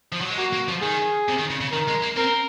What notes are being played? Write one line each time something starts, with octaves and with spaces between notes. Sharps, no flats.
F3
F#3
G#3
A#3 F#4
A#3
F3
D#3 G#4
C3
D#3
C#3
C#3
D#3 A#4
G#3
A#3
C4 A#4